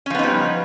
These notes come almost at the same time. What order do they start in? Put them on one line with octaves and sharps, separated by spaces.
C#4 F3 B3 D#4 G3